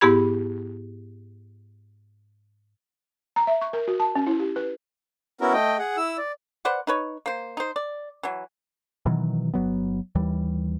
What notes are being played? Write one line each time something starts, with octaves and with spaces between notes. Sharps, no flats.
G#2 B3 E4 G4 B5 G#6
A#5
E5
C#6
A#4
F#4
A5
C#4
E4
G4
B4
B3 C#4 E4 F#4 A#4
A3 D#5 G5
G#4 F#5
E4 E6
D5
B4 C5 D5 F#5
D#4 B4 C#5
A#3 C5
D#4 C5
D5
E3 F#3
B2 D#3 E3 F#3
G1 F#3 B3
D#2 E3 G3